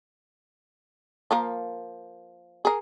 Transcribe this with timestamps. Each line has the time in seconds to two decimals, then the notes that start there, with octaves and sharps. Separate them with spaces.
1.31 F3 A#3 A#4
2.65 G#4 A#4